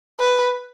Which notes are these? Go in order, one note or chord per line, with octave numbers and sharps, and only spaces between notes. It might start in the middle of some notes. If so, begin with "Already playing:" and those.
B4